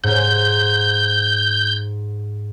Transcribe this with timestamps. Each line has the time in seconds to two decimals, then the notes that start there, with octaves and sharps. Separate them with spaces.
0.04 G#2 G6